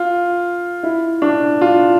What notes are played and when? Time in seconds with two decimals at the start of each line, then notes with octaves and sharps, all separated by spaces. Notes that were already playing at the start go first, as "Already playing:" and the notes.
Already playing: F4
0.83 E4
1.22 D4
1.61 F4